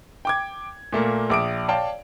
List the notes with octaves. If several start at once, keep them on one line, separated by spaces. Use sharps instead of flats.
G5 D6 G#6
A#2 A3 A#3
A#1 E5 D6 D#6 D7
C#5 D5 F5 G5 A5